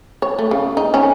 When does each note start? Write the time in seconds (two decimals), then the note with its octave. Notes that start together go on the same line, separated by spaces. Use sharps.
0.22 C#5
0.39 A3
0.51 C#3
0.77 D#4
0.94 C#4